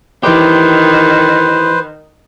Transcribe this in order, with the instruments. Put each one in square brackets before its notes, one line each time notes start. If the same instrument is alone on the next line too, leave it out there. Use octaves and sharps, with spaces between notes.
[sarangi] D#3 [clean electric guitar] E3 G4 [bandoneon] B4 C5